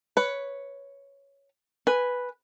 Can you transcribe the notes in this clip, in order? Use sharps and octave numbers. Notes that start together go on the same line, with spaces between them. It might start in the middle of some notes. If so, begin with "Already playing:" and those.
B4 C#5
B4 G#5